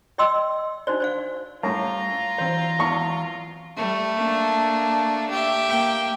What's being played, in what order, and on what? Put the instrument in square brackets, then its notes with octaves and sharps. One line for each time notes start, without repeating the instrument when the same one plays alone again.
[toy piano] D5 D#5 G5 C6 E6
D4 D#4 F#4 C5 D5
C5 D5 F5
[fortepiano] F#2 A2 [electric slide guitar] G3 C#4 [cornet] F4 [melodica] A#5
[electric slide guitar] E3 F#3 D5 [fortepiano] C4 C5
[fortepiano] G#1 E2 C#6
[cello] G3 [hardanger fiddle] A3
[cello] A#3 D4
[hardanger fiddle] G4 E5
[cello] A#3 G5